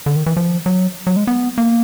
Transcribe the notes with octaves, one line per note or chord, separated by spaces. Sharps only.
D3
D#3
E3
F3
F#3
F#3
G#3
B3
A#3